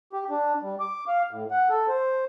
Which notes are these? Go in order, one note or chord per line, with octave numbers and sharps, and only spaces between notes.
G4
D4
G3
D6
F5
A2
F#5
A4
C5